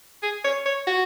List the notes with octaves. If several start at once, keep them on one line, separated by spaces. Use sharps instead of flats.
G#4
C#5
C#5
F#4